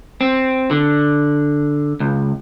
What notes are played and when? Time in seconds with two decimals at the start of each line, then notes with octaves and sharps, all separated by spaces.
0.21 C4
0.71 D3
2.00 C#2